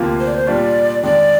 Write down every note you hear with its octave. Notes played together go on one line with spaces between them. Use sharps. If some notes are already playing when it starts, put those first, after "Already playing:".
Already playing: D2 C3 F3 A#3 F4
C5
D5
C5
A#2 G3 D4 F4 D5
F2 D#3 G#3 D4 D5